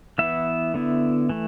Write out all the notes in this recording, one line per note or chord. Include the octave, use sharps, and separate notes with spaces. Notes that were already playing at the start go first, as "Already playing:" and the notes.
E3 B3 E4 E5
D3 B3 E4
E3 A3